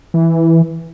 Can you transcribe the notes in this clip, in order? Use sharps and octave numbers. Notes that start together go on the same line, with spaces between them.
E3